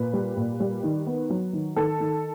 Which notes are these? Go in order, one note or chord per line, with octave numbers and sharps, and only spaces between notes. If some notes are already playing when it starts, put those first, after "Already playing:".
Already playing: A#2 B4
G3
A#2
G3
D#3
B3
F#3
D#3
D#3 A4
D#3